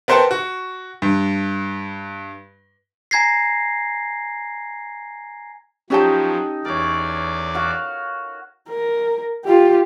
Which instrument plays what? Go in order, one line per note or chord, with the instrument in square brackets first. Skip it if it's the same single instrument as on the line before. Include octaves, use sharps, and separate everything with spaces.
[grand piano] B3 A#4 C5 F#5 G5 A5
F#4
G2
[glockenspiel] G#5 A#5 G#6 A#6 C7
[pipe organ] F3 F#3 [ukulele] C#4 G4 A5 [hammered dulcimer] D#4 A4 D#5
[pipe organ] E2 D5 [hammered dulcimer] A#4 C#5
[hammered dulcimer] F#4 F5
[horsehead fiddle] A#4
F4 G4